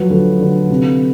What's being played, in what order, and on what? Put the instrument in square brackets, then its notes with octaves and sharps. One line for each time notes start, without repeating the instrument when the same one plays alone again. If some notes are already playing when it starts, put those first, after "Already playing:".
Already playing: [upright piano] F3 F#3 B4
D2
D3
C3